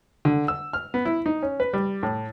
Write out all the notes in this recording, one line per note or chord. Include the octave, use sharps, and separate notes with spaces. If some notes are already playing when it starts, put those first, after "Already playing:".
D3
E6
F6
B3
E4
D#4
C#4
B4
G3
A2